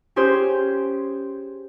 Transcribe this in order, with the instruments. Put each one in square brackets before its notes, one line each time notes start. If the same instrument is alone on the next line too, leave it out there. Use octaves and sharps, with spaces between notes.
[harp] C#4 G4 G#4 C5